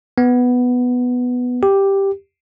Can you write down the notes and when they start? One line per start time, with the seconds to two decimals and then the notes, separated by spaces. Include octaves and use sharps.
0.18 B3
1.63 G4